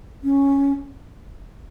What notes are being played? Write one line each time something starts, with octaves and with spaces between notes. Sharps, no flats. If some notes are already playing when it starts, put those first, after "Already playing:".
C#4